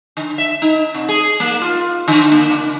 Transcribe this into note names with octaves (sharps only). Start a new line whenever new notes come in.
D3
E5
D#4
C3
G#4
A#3
F4
D3
A#3
C#3